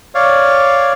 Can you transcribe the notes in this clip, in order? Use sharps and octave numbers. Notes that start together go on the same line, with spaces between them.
C#5 D5 F5